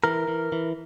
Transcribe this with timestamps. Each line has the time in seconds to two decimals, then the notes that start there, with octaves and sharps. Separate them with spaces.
0.04 E3 A#4
0.28 E3
0.52 E3